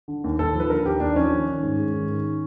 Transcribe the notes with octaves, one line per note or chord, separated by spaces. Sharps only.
D3
D#2
D#2 A4
F3
B4
D3 A#4
D#2 G4
D#2 D4
F3 C#4
D#3
D#3
G#2
G#2
D#3
D#3